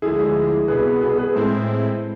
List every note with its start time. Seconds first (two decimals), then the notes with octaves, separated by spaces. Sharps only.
0.02 D2 D3 F3 G#3 E4 G#4
0.19 E4 G#4
0.68 C2 B2 B3 G#4 B4
1.01 G#4 B4
1.18 G#4 B4
1.35 A2 G#3 C4 E4 A4 C5